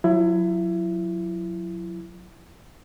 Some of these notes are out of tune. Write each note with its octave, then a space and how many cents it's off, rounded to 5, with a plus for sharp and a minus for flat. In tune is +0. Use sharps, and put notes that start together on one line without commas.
F#3 -30 E4 +25